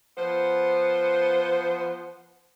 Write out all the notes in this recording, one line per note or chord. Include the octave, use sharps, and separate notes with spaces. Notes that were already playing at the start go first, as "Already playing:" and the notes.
F3 B3 C5